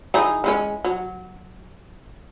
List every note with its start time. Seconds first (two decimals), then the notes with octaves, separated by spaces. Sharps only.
0.14 E3 D#4 G#4
0.44 E3 G#3 C#4
0.85 F#3